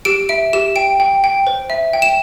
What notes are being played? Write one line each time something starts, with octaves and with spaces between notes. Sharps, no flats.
G4 D7
E5 D7
G4 E7
G5 D7
G5
G5
C5
E5
G5
E7